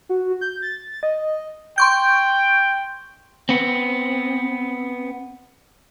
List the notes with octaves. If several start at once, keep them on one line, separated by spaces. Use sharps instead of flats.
F#4
G6
A6
D#5
G5 C6 C#6 G6
B3 C4